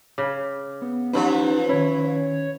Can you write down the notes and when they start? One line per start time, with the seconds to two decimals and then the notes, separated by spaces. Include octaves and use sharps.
0.18 C#3 D6
0.82 B3
1.13 E3 F3 C#4 D#4 G4 B4 C5
1.69 D#3 C#4 E4 C#5